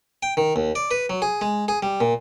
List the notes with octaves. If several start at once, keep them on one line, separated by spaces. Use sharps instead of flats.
G5
D#3
D#2
D5
B4
F#3
G#4
G#3
G#4
G3
A#2